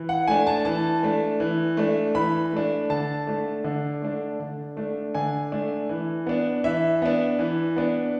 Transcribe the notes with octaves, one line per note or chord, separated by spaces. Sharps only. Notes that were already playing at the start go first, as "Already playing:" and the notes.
Already playing: E3
F#5
A3 D4 G#5
A5
E3 A5
A3 D4
E3
A3 D4
E3 B5
A3 D4
D3 A5
A3 D4
D3
A3 D4
D3
A3 D4
D3 G#5
A3 D4
E3
B3 D4
E3 E5
B3 D4
E3
B3 D4